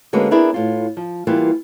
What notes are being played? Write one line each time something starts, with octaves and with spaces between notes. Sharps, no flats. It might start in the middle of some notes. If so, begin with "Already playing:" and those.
D3 G#3 A#3 C#4 F#4 B4
B3 D4 E4 G#4 A#4
A2 F4
F3
E3 G3 A#3 B3 F4